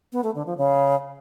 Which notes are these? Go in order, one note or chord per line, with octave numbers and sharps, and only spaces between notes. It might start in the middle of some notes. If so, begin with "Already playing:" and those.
B3
A3
D3
F3
C#3